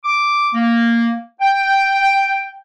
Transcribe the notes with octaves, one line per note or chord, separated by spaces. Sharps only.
D6
A#3
G5